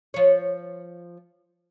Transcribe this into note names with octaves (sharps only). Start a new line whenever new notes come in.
F3 C#5